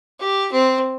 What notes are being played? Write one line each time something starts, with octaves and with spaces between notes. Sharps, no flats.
G4
C4